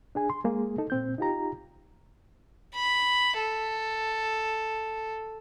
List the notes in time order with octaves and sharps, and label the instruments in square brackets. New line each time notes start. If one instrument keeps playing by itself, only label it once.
[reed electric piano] D4 G#4 G#5
C6
G#3 A#3 G#4
D#4 A4
A#2 C4 G6
D#4 F4 G4 A#5
[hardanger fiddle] B5
A4